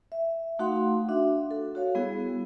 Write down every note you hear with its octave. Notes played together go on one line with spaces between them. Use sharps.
E5
A3 D#4 F#4 F5 F#5 C6
D4 F#4 E5
A4
F#4 C#5 F5
G3 B3 E4 G#4